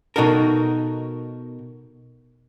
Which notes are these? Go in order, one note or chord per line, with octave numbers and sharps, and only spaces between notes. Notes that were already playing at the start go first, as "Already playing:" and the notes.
B2 D#4 F#4 A4 A#4